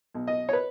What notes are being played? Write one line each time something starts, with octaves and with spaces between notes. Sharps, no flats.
B1
D#5
C#5
B4